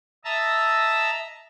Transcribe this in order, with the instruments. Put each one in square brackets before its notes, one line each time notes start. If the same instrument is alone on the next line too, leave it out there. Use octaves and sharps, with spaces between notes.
[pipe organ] D#5 E5 A5 A#5 E6